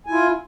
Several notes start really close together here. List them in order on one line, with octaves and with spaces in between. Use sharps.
G#5 E4 F4